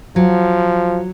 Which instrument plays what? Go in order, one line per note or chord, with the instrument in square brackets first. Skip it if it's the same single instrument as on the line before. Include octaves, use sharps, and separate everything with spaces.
[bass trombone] F3 [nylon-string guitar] F#3